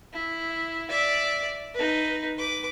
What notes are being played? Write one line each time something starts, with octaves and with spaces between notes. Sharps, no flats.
E4
D5 E5
D#4 B4
B4 D6